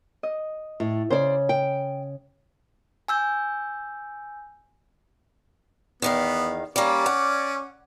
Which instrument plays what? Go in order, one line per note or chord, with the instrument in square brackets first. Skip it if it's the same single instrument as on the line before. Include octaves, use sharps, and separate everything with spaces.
[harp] D#5
[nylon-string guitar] A2
[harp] C#3 [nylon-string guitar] C5 D5
[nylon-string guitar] G5
[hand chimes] G#5 E6 G6
[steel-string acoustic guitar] E2 D#3 F5 [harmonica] B3
[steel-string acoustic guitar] G3 A#3 [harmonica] C#4 D5
[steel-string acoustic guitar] F#5